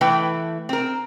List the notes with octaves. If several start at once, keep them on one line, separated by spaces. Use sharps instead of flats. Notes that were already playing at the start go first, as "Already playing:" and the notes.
E3 A3 B4 G5
C4 A#4